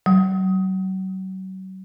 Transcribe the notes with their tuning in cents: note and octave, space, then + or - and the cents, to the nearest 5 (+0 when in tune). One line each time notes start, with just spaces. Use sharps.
F#3 +35 D#6 +25